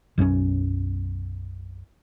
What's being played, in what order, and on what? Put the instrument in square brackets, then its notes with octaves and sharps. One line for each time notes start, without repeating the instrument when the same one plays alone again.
[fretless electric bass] B1 F#2 C4 C#4